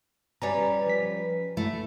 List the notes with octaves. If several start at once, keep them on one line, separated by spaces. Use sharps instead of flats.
G3 C#4 B4 D5 G#5 A#5
F3 B6
A3 E4